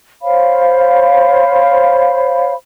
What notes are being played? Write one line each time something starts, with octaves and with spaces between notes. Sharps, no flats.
C5 C#5 F5 B5